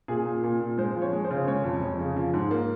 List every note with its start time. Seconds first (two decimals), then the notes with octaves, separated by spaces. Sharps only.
0.08 A#2 G#4
0.26 A#2
0.44 A#2
0.60 A#2
0.78 G#3 C5
0.96 F3
1.02 C#5
1.13 G#3
1.25 C5
1.31 C#3
1.48 G#3 C#5
1.64 F2
1.82 F2
1.99 C#3
2.16 F3
2.34 G#2
2.51 A#3